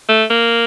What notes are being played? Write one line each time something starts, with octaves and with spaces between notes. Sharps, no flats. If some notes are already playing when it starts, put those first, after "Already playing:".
A3
A#3